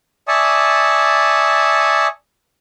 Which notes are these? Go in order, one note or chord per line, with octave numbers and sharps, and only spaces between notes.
D5 E5 G#5 A5 C#6 D#6